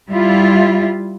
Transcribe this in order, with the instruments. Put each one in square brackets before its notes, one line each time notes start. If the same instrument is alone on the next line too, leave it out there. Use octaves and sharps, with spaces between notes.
[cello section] G3 E4 F4